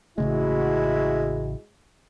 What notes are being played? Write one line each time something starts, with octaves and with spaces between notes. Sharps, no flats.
A1 C#3 G#3 A3 E4 F#4